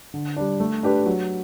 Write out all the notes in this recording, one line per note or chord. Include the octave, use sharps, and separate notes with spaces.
D3
G3 D4
A3
D4 G4 B4
F#3